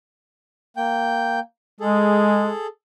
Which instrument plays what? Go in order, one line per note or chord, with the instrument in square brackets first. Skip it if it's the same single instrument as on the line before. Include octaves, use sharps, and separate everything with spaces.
[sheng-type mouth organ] A#3 G5 G6
[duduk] G#3 [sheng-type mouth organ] G#4 A4